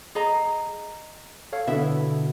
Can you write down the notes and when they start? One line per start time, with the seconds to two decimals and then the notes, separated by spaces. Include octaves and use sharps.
0.15 G#4 D#5 A#5
1.53 A4 C#5 F5
1.67 B2 D3 B3 E4 E5